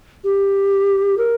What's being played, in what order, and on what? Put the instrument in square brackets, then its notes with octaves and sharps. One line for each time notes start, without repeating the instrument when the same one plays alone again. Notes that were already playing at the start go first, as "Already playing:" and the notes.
[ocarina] G4
A#4